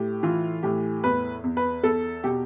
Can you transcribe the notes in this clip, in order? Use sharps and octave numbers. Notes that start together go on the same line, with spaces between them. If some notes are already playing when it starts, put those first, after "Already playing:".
Already playing: A2 G4
E3 F4
A2 G4
E2 B4
E2
B4
E2 A4
B2 G4